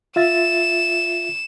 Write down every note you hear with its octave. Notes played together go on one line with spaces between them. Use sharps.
F4 E5 A6 E7